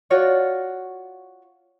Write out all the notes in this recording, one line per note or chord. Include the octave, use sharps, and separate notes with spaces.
F4 F#4 C#5 D5